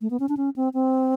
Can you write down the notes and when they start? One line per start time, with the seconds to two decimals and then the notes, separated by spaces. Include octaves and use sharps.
0.01 A3
0.11 B3
0.20 C#4
0.29 D4
0.37 C#4
0.56 C4
0.74 C4